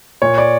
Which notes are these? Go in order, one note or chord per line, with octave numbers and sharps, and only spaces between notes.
A#2 C#5
D5